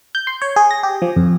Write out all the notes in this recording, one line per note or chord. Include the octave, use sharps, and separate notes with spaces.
G6
C6
C#5
G#4
A#6
G4
F3
F2